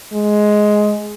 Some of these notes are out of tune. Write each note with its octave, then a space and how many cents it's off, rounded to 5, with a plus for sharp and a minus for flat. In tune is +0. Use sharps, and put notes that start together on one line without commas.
G#3 +10